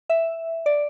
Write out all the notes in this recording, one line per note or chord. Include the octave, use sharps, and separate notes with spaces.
E5
D5